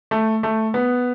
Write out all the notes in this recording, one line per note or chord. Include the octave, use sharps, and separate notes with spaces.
A3
A3
B3